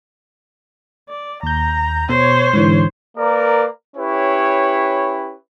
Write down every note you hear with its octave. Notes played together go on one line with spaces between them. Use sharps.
D5
D#2 A#5 G6
B2 C5 C#5
G#2 D3 E3
A#3 A#4 B4 D5
C#4 E4 G4 B4 C#5